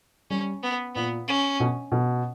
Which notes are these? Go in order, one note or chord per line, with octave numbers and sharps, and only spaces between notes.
G3 C#4
B3
A#2 B3
C#4
B2
B2